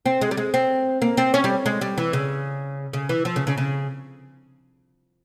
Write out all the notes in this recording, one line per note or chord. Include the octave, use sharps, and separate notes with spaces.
C4
G#3
G3
G#3
C4
A#3
C4
C#4
G3
G#3
G3
E3
C#3
C#3
E3
F3
C#3
C#3
C#3